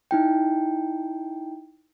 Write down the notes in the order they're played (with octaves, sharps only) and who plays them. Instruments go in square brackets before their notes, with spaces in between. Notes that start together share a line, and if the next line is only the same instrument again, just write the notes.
[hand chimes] D#4 E4 G5